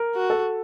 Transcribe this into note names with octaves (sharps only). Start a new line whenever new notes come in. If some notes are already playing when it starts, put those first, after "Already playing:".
Already playing: A#4
F#4
A4